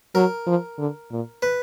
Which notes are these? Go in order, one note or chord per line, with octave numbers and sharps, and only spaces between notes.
F#3 A#4
F3
D3
A#2
B4